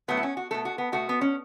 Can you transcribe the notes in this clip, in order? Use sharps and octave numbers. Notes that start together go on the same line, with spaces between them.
A2 F#3 A3 B3
E4
C#4
F#4
B2 A3 A4
F#4
B3
B2 A3 F#4
B3
C#4